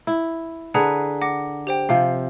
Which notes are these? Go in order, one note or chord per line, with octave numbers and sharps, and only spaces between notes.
E4
D3 G#4 B4 F#5 A5 A#5
F#5 D6 A#6
G4 C5 G5
C3 F3 F5